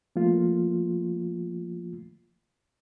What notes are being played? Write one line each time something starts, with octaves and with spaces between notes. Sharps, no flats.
F3 A3 A#3 F4